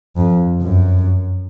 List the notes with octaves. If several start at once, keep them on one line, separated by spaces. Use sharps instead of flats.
F2
F#2